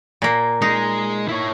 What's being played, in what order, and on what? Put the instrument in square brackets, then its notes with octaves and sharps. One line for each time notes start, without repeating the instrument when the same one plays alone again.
[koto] A#2 A#3
[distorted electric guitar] G#3 [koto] D#4
[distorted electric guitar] E4 C#5